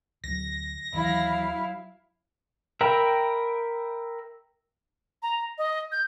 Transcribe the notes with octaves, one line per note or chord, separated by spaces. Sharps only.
D2 F#3 A#6
D#2 E3 F#3 E4 F5
A#4 E5 G5 A#5 B5
A#5
D#5
G6